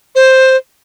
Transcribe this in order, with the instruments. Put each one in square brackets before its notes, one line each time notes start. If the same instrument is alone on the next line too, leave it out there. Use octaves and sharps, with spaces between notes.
[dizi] C5